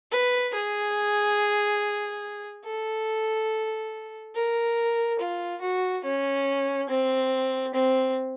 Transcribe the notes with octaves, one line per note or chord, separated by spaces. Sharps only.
B4
G#4
A4
A#4
F4
F#4
C#4
C4
C4